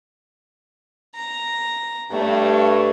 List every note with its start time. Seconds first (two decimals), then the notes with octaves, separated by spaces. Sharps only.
1.15 A#5
2.11 G2 A3 C#5